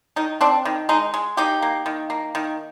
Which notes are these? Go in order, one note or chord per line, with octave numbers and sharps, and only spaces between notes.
D#3 D#4
C4 D4
D#3
G#3 D#4
G#3
A#3 D#4 G4
A#3
D#3
A#3
D#3